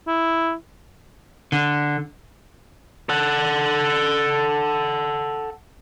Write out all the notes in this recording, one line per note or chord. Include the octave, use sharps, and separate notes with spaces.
E4
D3
A4 F#5